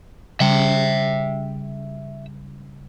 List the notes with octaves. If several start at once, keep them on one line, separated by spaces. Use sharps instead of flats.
C#3 G3 E5 G5